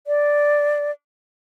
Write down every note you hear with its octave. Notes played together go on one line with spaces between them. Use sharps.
D5